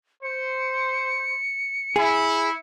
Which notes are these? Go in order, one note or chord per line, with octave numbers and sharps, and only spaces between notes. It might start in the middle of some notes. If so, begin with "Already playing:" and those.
C5 C#7
E4 G#4